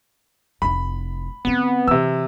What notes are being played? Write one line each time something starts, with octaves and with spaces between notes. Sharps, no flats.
F1 E4 B5
D3 B3 C4
C3 E3 E6